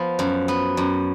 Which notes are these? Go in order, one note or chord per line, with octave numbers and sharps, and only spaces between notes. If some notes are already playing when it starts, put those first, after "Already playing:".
Already playing: F3 B3
F#2
B3
F#2